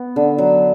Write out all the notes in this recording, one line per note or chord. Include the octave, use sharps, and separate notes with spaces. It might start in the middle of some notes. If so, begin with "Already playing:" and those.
Already playing: B3
D3
F#3